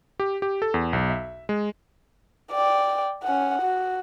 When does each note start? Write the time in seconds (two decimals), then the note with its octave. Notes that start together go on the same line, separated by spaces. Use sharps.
0.20 G4
0.42 G4
0.62 A4
0.74 E2
0.93 B1
1.10 E5
1.49 G#3
2.51 D5 G5
3.24 C#4 F#5
3.62 F#4